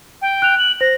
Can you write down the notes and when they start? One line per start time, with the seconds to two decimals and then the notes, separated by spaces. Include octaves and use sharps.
0.22 G5
0.42 F#6 F7
0.59 F#7
0.81 C5 A#6